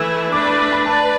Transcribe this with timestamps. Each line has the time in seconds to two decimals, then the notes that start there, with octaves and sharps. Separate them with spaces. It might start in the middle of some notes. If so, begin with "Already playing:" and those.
Already playing: E3 A3 E4
0.32 A3 D4 B4 D5 D6
0.46 B5
0.59 D6
0.72 B5
0.85 B4 D5 A5